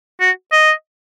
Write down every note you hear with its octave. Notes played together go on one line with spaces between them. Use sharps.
F#4
D#5